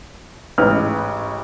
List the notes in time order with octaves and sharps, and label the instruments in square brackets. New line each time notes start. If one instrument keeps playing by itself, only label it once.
[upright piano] A1 G#2 C#4 B4 F6